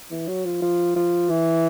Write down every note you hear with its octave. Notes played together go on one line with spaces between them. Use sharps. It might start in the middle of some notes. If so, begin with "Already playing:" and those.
E3
F#3
F3
F3
F3
E3